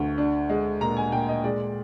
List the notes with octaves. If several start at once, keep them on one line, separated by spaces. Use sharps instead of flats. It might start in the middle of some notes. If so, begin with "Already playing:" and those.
Already playing: D2
D4
G#3
A#2 A#5
G#5
A#2 G5
D#5
G#3 D5